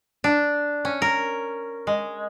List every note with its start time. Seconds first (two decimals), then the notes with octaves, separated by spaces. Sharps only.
0.24 D4
0.85 C#4
1.02 A#4
1.87 G#3